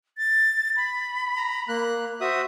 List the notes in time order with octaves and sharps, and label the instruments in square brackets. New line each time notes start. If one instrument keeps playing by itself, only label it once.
[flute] A6
B5
[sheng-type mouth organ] A#5
A#3 F#6
[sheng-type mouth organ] F#4 E5 D#6 [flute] C5